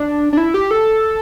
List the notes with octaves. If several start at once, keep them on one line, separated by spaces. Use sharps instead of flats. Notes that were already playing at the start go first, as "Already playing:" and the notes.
Already playing: D4
D4
E4
G4
A4